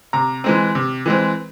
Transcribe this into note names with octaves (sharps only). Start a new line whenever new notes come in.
C3 A#5
E3 G#3 C4
C3
E3 G#3 C4